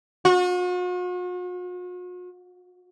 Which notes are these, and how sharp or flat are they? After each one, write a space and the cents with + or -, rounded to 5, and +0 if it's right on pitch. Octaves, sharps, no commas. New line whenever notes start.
F#4 -45